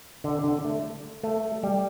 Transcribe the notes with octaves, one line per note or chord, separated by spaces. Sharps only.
D3
D3
A3
A3
G3